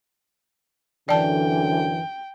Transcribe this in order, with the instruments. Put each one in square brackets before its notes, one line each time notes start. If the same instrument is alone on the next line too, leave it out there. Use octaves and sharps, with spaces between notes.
[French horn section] F#2 D3 [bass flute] E3 [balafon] D5 A5 [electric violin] G5